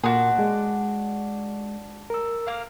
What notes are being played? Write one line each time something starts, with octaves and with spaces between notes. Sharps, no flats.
A#2 A#3 D4 F#4 G#4 C6
G#3
A#4 E6
A#3 F5